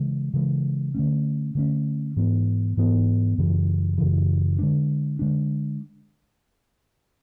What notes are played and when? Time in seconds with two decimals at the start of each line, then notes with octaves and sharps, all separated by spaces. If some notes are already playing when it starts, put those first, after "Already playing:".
Already playing: C#3 E3 G#3
0.33 C#3 E3 G#3
0.95 D3 A3 C#4
1.55 D3 A3 C#4
2.16 G#2 E3 B3
2.77 G#2 E3 B3
3.38 F#2 C#3 E3
3.98 F#2 C#3 E3
4.59 D3 G#3 D4
5.19 D3 G#3 D4